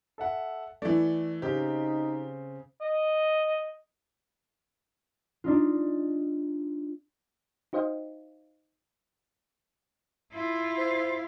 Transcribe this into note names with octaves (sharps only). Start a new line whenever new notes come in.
A4 E5 F#5
E3 A3 D5
C#3 C4 D#4 G4
D#5
D4 D#4 F4
D#4 F#4 C5 D#5 F5 G5
E4 F4
C5